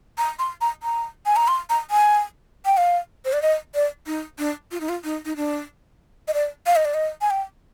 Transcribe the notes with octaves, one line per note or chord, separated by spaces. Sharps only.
A#5
C6
A#5
A#5
G#5
A#5
C6
A#5
G#5
G5
F5
C5
D5
D#5
D5
D#4
D4
F4
D#4
F4
D#4
D#4
D4
D#5
D5
F5
D#5
D5
D#5
G#5
G5